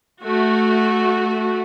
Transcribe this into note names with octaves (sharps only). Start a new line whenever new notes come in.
A3 F#4